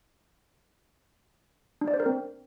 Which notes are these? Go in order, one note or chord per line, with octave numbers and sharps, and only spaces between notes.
D4
D5
C5
A#4
C4